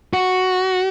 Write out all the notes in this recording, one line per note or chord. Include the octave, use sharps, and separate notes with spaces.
F#4